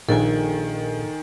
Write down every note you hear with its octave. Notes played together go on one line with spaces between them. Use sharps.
A#1 D#3 A4 G5 G#5